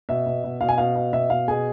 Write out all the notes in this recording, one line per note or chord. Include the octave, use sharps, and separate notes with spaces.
B2 E5
B2
B2
B2 F5
G#5
B2 F5
B2
B2 E5
B2 F5
B2 G#4 G#5